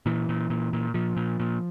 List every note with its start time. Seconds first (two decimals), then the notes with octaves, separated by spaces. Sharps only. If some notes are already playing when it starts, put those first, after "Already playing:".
0.06 A#2 E3
0.29 A#2
0.50 A#2
0.73 A#2
0.94 A#2 F3
1.17 A#2
1.40 A#2